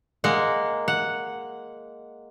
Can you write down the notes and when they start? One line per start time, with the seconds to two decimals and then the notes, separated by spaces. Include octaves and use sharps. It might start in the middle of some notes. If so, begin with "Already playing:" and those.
0.24 G#3 A#3 F#5
0.88 F#5